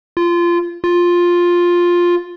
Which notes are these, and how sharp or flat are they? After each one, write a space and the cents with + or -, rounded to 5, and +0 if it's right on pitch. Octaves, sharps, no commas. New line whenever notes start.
F4 -20
F4 +5